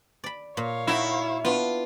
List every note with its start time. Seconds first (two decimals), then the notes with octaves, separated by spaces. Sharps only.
0.24 D5 B5
0.57 A#2 C#5 F5
0.87 D#4 E4 F#4
1.45 B3 D4 F4